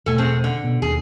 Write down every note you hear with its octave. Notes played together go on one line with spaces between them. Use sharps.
E1 B2 A3 A4 G#5
A2 C4 G#4
D3
B2
E1 D#2 G#4